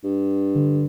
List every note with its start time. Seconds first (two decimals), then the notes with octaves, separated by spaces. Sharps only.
0.04 G2
0.55 D3